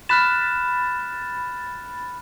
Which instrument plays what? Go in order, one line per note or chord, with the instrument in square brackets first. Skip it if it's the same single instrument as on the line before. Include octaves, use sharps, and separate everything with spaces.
[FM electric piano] B5 A6 [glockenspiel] F6 F#6 E7